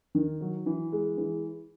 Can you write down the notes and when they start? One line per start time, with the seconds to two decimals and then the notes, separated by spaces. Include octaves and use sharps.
0.15 D#3
0.41 F#3
0.66 E3
0.92 G#3
1.18 E3